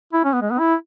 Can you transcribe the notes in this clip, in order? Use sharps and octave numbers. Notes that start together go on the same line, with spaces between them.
E4
C#4
B3
G#3
B3
E4